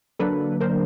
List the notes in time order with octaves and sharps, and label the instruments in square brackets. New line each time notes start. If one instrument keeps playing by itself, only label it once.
[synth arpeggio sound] D3 F#3 A#3 D4 A4 B4
A#4 C5